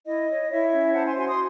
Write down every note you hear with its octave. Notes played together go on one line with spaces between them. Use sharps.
E4 D#5
C#5
E4 C#5 E5
C#4
C5 F#5 A5
G#5 C6
F#4 G#5 C6
C6 D#6